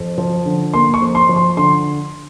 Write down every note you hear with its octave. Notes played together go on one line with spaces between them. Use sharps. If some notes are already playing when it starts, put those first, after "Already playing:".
Already playing: F2
F3
D3
A#3 C6
C#6
F2
C6
F3
C6
D3 C6